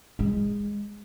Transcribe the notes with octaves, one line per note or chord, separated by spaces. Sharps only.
G#3